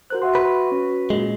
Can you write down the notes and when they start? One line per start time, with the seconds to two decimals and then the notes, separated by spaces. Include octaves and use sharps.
0.10 F#4 A#4 C5 F#6
0.22 F#4 E5 F#5 C6
0.35 B4
0.72 C#4
1.10 A#2 G#3